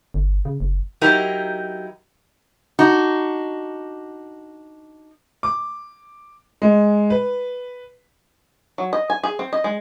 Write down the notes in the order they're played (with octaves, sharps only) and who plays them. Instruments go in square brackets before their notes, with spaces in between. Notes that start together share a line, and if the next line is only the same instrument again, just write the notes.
[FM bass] G1
C#3
F#1
[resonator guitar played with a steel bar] F#3 D#4 E4 G4 A#4
D4 D#4 F#4
[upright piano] D6
G#3
B4
[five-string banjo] F#3
D#5
G#5
G#4
C4
D#5
G#3